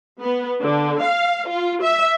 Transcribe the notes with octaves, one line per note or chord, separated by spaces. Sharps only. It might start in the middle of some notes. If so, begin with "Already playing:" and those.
B3
D3
F5
F4
E5